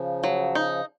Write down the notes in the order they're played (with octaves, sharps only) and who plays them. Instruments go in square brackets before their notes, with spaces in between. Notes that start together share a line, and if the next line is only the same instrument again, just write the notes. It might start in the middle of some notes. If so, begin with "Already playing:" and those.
Already playing: [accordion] C#3 F3
[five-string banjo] F#3
D#4